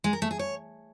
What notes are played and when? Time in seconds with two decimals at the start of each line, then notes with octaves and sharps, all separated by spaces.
0.04 G#3
0.13 A#4
0.22 A3
0.31 G#4
0.39 C#5